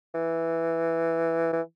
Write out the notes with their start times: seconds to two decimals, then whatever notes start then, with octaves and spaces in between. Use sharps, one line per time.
0.15 E3
1.53 E3